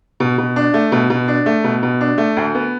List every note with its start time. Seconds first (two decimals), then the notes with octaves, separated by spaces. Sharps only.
0.20 B2
0.38 B2
0.56 D4
0.74 A3
0.92 B2
1.10 B2
1.28 D4
1.46 A3
1.64 B2
1.83 B2
2.01 D4
2.18 A3
2.37 D2
2.55 B3